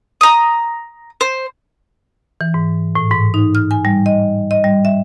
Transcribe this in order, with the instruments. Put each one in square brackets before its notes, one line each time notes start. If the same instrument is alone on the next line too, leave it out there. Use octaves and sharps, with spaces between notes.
[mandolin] A#5 D#6
C5
[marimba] E3
G#2
A2
G#2
D#4
F6
G#5
G3
D#5
D#5
G3
E5